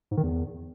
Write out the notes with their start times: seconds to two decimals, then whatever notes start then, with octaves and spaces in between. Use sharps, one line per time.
0.11 G#2
0.17 D#3
0.23 E2